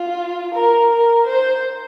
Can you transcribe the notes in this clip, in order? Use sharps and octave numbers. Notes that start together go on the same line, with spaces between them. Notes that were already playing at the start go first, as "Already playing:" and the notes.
Already playing: F4
A#4
A#4
C5